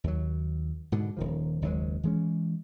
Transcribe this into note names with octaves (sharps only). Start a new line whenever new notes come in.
D#2 F#3
G#2 B2 D3
D#1 D#3 F3
F#1 D#2 F#3 G#3
E3 G#3 C#4